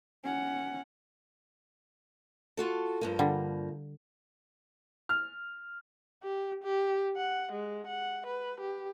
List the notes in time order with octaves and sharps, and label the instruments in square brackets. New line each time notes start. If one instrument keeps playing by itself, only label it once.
[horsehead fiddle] C#4 F#5
[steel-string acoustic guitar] F4 F#4 A4
G2 F3 A#3
[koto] D3 G3
[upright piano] F6
[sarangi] G4
G4
F#5
G#3
F#5
B4
G4